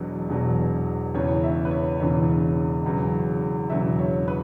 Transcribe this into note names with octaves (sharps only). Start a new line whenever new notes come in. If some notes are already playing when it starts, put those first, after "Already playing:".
Already playing: E1 E2 B2 F#3
E1 E2 B2 F#3
E1 E2 C#3 E3 C#5
E5
B4
C#5
E1 E2 C#3 E3 C#5
E1 E2 C#3 F#3
E1 E2 C#3 F#3 E5
C#5
B4